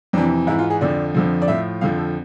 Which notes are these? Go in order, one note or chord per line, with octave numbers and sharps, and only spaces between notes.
F2 C3 E3 D4
G#2 E3 E4
F4
G#4
F2 D3 F3 D5
F2 D3 F3
D5
A2 F3 E5
F2 D3 F3 F5
A4